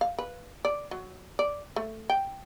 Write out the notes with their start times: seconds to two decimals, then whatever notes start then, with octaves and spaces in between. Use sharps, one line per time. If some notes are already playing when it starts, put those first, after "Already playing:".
0.01 F5
0.19 B4
0.65 D5
0.91 F#3
1.39 D5
1.76 A3
2.10 G5